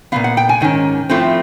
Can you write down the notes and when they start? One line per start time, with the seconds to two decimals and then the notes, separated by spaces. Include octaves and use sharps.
0.12 A#2 G3 B3 F5
0.24 F#5
0.37 G5
0.49 G#5
0.61 G#2 D#3 C#4
1.10 A2 F3 A3 C4